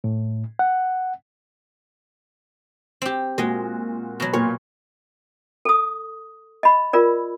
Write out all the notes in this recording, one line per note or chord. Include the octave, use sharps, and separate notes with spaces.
A2
F#5
C4 G4
A#2 G#3 F#4 D#5
B2 F#3
A#2 C#5
A4 D#6
D#5 B5
F4 A#4 D5